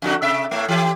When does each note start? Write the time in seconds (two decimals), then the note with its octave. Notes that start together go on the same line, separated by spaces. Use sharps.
0.02 F2 D3 F#4
0.22 C3 E5
0.51 A2 A3
0.68 E3 G4